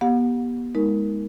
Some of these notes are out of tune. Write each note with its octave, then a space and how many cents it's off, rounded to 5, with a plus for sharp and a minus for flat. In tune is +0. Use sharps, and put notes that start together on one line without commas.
B3 -30 G4 +0 F#5 -35
G#3 +0 D#4 +25 A#4 +0